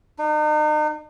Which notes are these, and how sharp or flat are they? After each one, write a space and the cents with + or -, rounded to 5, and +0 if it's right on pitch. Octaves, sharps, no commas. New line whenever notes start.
D#4 -40